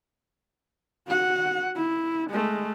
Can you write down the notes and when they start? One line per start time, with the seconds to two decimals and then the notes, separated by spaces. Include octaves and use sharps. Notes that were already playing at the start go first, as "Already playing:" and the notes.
1.08 F#4 F#5
1.76 E4
2.30 G#3 A3